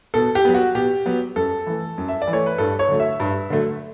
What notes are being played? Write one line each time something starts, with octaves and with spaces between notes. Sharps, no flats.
B2 A4
G4
F#3 B3
F#4
B2 G4
F#3 B3
F#2 A4
E3 A3
F#2
E5
D5
E3
A3 C#5
B4
G2 A4
C#5
D3 F#3 A3
E5
G2
D3 F#3 A3